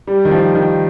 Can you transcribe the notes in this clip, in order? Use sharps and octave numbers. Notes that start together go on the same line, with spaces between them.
G3
D#3
F3
D#3